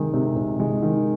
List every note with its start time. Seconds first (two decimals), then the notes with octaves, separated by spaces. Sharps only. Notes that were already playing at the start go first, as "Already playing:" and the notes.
Already playing: C3 D#3 G#3
0.14 C3
0.36 C3
0.60 G#3
0.83 D#3